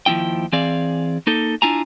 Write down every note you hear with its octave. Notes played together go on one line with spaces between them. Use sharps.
D#2 F3 D4 E4 G5
E3 C4 G#4 D5 F5
A#3 D#4 A4
D4 E4 F4 G#5 A#5